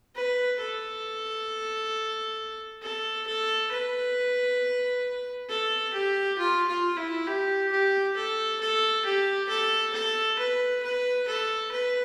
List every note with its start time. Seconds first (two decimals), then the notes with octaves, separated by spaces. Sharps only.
0.15 B4
0.59 A4
2.82 A4
3.26 A4
3.71 B4
5.49 A4
5.93 G4
6.39 F4
6.67 F4
6.97 E4
7.27 G4
7.71 G4
8.16 A4
8.60 A4
9.05 G4
9.49 A4
9.93 A4
10.38 B4
10.83 B4
11.27 A4
11.71 B4